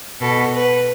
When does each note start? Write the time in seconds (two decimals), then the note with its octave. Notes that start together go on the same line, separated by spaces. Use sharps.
0.21 B2 A4
0.54 B4